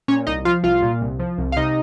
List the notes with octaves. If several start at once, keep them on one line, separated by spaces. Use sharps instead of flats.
A#2 C#4 C#5
C2 D#4 D#5
F3 F4 F5
C2 F4 F5
A#2
C2
F3
C2
F5
C3 D#4 D#5